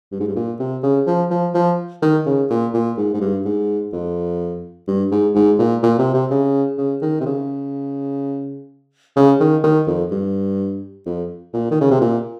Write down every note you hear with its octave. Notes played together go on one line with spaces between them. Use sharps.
G2
G#2
G2
A#2
C3
C#3
F3
F3
F3
D#3
C#3
A#2
A#2
G#2
G#2
G2
G#2
F2
G2
G#2
G#2
A#2
A#2
C3
C3
C#3
C#3
D#3
C3
C#3
C#3
D#3
D#3
F2
G2
F2
A#2
D#3
C#3
C3
A#2